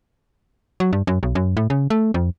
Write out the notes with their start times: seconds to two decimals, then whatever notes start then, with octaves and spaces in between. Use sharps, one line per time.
0.80 F#3
0.93 G2
1.07 F#2
1.23 B1
1.35 F#2
1.57 A2
1.70 C#3
1.90 A3
2.14 F2